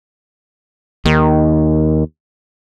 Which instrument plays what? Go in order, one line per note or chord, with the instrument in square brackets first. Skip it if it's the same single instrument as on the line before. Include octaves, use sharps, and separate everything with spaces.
[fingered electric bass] D#2 [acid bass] D#3